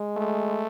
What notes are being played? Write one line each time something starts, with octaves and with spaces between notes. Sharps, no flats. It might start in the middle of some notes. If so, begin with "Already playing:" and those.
Already playing: G#3
A3